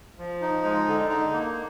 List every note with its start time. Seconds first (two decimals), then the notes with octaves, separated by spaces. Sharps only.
0.18 F3
0.41 D#4
0.64 G#3
0.87 D3
1.09 D#4
1.32 A#3